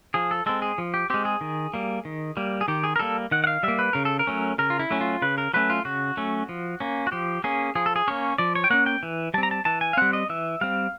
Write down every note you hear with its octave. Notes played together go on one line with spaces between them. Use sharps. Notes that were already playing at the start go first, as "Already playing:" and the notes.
F3 G#4
A4
G#3 C4 A4
G#4
F3
G4
G#3 C4 G4
G#4
D#3
G3 A#3
D#3
G3 A#3
G#4
D#3 G4
G#4
A#4
G3 A#3 A4
D#3 F#5
F#5
F5
G3 A#3 E5
B4
C#3 A#4
A4
A#4
F#3 A3 C#4
C#3 A#4
F4
E4
F#3 A3 C#4
F4
C#3 B4
A#4
F#3 A3 C#4 B4
F4
C#3 F#4
F#3 A3 C#4
F3
A#3 C#4
F#4
F3 G4
A#3 C#4 G#4
F3 G#4
A4
G#4
A#3 C#4 C#5
F3 D5
C#5
G5
A#3 C#4 F#5
G5
E3
G3 C4 A5
A#5
A5
E3 A5
G#5
F5
G3 C4 F#5
D#5
E3 E5
G3 C4 F5